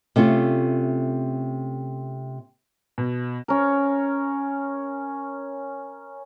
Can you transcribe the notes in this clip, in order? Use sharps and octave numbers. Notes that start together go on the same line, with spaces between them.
C3 A3 C#4 F4
B2
C#4 A#4